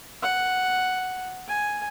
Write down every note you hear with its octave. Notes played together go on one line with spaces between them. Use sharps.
F#5
G#5